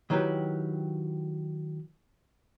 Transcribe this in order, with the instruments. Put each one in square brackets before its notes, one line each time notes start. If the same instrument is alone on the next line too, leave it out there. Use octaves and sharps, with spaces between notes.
[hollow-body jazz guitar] D#3 F#3 E4 G4 B4